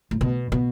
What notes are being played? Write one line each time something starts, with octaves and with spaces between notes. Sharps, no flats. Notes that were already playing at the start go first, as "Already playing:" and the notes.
A2
B2
B2